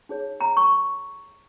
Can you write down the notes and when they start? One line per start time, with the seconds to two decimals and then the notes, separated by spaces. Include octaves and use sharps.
0.09 D#4 G#4 C#5
0.41 A#5
0.57 C#6
0.72 C#6